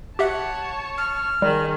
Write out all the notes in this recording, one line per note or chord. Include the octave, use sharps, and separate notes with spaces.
G4 C#5 E5 F#5 A5
F6
D#3 G3 G#4